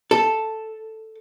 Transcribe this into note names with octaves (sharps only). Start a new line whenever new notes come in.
A4